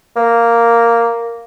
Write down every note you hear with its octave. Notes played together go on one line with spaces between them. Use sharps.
A#3